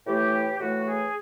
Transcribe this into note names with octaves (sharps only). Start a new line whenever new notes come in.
A2 E3 A3 G4
A2 E3 A3 F#4
G#4